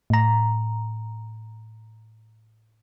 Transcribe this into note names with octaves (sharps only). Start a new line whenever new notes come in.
A2 A#5